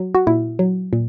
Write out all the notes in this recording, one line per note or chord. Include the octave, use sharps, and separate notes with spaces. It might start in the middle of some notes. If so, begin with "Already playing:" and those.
Already playing: F#3
F#4
A#2 E4
F#3
A#2